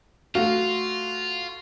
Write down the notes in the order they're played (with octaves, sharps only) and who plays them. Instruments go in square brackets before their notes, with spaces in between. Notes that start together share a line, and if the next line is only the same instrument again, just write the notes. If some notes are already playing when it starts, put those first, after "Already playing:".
[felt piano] A3 F#4 [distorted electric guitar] F4 [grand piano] F5